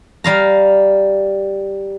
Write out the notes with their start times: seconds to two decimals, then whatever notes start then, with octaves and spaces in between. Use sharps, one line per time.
0.24 G3 F5 A#5